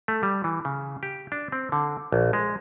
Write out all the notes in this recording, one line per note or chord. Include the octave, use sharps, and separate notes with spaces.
A3
G3
E3
C#3
G4
D4
C4
D3
A#1
G#3